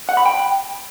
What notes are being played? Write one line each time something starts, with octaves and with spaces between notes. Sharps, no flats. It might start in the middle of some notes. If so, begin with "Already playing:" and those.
F#5
B5
G5